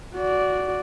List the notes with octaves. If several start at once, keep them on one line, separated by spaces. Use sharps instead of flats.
F#4 D5